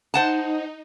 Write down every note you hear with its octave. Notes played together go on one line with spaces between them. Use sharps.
D#4 C5 F#5 A5